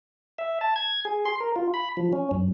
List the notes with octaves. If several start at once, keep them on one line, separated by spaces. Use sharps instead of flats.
E5
A5
G#6
G#4
C6
A#4
F4
B5
F3
C#4
F#2